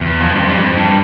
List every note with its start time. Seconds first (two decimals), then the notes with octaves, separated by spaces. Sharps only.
0.01 E2
0.20 F2
0.35 G2
0.39 F2
0.48 G2
0.58 F2
0.77 G2